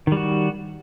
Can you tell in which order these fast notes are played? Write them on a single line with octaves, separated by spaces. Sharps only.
D#3 G3 F#4